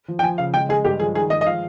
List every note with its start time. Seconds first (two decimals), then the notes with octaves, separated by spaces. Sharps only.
0.08 F3
0.19 G5
0.23 F3 G#5
0.38 C#3 F5
0.54 G#3 G5
0.69 G#3 G#4
0.85 G2 G4
1.00 F3 G#4
1.15 D#3 G#4
1.30 G#3 D#5
1.41 D#5
1.46 F3 F5